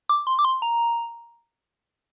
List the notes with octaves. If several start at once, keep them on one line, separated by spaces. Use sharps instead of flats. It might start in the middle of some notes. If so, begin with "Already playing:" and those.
D6
C6
D6
C6
A#5